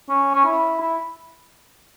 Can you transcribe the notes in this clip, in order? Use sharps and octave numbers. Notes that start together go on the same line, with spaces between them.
C#4
C#4
E4
E4